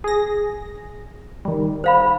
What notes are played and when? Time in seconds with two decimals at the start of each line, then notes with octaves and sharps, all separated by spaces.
0.04 G#4 A#6
1.45 D#3 G3
1.84 C5 F5 B5